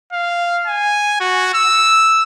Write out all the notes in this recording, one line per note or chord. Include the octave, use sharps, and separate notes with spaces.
F5
G#5
F#4
E6